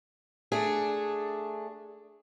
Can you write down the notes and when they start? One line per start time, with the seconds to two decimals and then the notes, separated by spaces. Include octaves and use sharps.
0.52 A3 D4 G#4